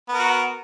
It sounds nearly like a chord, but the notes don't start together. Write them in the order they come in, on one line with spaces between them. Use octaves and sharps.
B3 A#4 F#4